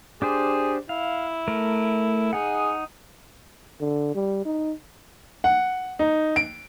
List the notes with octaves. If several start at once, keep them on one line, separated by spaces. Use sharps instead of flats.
D4 G4 G#4 C5
E4 F5
A3 A#4
D#4 G#4 F#5
D3
G3
D#4
F#5
D#4
D7